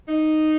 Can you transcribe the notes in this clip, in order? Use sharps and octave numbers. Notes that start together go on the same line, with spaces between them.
D#4